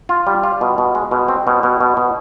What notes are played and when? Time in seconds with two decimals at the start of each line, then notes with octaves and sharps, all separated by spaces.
0.09 F4
0.27 G3
0.44 F4
0.61 B2
0.78 B2
0.95 G#3
1.11 B2
1.28 C4
1.47 B2
1.63 B2
1.81 B2
1.97 B2